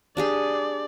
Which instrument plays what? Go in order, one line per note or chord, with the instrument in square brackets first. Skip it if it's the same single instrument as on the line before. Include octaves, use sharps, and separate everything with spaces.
[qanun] D4 G4 G#4 [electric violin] D5